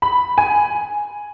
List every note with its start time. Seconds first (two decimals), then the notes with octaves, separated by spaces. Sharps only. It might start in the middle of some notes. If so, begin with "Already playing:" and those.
0.02 B5
0.38 G#5